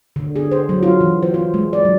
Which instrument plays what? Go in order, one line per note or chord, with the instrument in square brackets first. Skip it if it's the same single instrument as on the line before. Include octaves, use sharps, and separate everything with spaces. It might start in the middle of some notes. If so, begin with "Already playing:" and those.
[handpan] D3
G#4
C5
F#3
F4
E3
C5
F4
G#3
D5
F#3